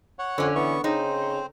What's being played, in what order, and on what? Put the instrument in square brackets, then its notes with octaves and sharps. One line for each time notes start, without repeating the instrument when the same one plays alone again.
[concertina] C#5 F#5
[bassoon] F2 [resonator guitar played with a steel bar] D3 C#4
[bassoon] E3 [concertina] B3 C#6
[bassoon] C#3 [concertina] C4 C5 [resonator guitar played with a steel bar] D#4